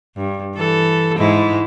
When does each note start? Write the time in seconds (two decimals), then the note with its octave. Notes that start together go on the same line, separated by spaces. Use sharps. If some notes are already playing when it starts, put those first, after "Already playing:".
0.16 G2
0.56 E3 A4
1.17 G#2 G#3 E4